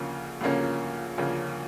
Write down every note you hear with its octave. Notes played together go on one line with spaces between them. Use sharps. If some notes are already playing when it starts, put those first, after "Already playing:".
Already playing: D2 C#3 F3 A#3 C#4
D2 C#3 F3 A#3 C#4
D2 C#3 F3 A#3 C#4